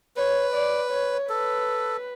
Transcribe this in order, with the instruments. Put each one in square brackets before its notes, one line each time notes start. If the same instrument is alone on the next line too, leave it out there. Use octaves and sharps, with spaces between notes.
[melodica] B4 [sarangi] C#5
[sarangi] D5
C#5
[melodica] A4 [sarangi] B4